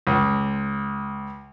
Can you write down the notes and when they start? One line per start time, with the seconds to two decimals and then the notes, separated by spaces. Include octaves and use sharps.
0.07 C#2